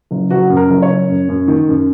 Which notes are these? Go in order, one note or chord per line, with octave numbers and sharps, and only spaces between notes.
F#1
F#1 F#4
F#2
A#4
F#1
C#5
F#1
F#2
F#2
D#3
F#2